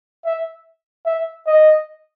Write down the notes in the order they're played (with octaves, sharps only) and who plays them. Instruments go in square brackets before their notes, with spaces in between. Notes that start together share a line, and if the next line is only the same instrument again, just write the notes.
[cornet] E5
E5
D#5